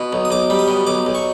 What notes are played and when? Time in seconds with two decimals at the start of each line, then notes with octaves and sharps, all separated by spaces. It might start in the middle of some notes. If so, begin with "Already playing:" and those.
Already playing: B2
0.13 B1
0.25 D#6
0.30 B1 D6
0.50 G3
0.59 D#6
0.68 B2
0.87 B1 D6
1.06 B1
1.15 C#6